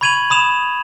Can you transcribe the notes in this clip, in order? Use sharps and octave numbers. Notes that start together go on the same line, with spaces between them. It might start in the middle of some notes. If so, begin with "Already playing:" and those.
B5 C#6 G#6 D#7 F7 F#7
B5 D#6 E7 F7